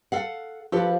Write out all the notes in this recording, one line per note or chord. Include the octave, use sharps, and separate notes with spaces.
A4 F5 F#5
F3 G4 A4 B4